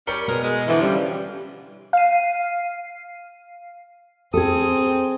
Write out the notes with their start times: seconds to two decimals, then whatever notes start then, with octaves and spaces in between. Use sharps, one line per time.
0.07 G3 C#4 A#4 C#7 G7
0.28 B2 G#3 A#4
0.42 G#3
0.68 D3 E3 F3
0.82 G3 C#4
1.93 F5 C7 D#7
4.34 C4 G#4 A4 D#6